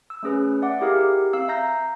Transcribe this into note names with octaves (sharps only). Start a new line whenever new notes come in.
E6
A3 C#4 G#4 B4
D5 E5 F#5 D6
E4 G4 G#4 A#4 E5 F5
C4 F5 E6
E5 F5 A#5 G6 A#6